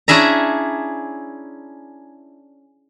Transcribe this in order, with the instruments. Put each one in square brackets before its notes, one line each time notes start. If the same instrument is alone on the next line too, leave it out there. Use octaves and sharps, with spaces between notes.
[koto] C#4 D4 E4 G#4 E5 A#5